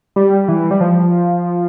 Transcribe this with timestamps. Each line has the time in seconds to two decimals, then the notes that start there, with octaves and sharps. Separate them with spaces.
0.16 G3
0.48 E3
0.71 G3
0.81 F3